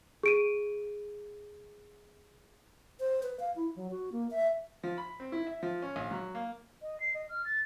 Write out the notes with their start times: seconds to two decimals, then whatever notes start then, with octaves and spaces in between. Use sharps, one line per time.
0.23 G#4 D7 D#7
3.00 C5
3.23 B4
3.40 F5
3.56 E4
3.76 F#3
3.91 F#4
4.12 A#3
4.31 E5
4.83 F3
4.98 B5
5.20 C4
5.32 E4
5.47 E5
5.63 F3
5.82 C#4
5.96 A#1
6.11 F#3
6.35 A#3
6.82 D#5
7.00 C7
7.14 D#5
7.29 F6
7.45 A6